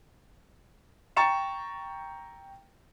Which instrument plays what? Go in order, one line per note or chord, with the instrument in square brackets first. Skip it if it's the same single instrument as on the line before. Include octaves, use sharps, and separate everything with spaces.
[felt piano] G5 A#5 C#6 A6 C#7 E7